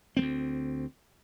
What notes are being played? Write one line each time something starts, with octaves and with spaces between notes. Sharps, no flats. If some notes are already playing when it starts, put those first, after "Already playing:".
D2 A3 C4